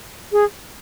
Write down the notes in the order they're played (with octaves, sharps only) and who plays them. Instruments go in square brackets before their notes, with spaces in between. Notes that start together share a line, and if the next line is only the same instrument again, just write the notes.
[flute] G#4